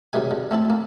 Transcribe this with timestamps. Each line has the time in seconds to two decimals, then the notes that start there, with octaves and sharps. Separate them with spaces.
0.13 F#2 C3 D#3 E3 G#3 G#5
0.31 D3
0.51 A3 C4 E4 A5
0.70 A#3